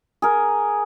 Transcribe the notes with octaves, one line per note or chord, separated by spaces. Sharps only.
G#4 A#4